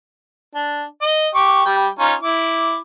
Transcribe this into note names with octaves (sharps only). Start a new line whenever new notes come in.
D4
D#5
G4 C#6 D6
G3 G5
C#4 D#4 F4
E4 D6